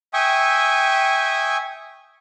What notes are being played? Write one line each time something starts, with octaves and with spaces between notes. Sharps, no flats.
E5 G5 G#5 C#6 D#6